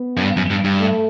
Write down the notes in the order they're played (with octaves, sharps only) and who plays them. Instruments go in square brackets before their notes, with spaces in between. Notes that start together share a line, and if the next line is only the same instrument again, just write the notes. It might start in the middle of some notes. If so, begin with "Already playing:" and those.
Already playing: [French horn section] B3
[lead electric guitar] F#2
G2
F#2
G2
G2
[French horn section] A3